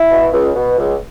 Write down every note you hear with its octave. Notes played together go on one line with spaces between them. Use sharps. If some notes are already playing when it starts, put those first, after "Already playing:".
Already playing: E4
B2
C#2
B2
C#2